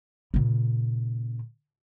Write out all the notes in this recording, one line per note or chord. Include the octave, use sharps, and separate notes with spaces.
A#2 C#3